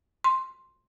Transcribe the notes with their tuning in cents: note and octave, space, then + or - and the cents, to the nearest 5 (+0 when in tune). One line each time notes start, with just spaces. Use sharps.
C6 +5